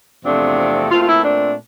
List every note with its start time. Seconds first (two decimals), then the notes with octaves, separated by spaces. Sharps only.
0.25 E2 C3 F3 A3 C4 D4
0.91 A#2 A3 C4 F4
1.01 F4
1.08 E4
1.24 D4